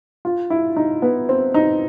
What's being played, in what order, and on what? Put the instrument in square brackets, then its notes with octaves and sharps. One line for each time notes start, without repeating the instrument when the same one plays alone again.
[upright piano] F4
E4
D#4
B3
C4
D#4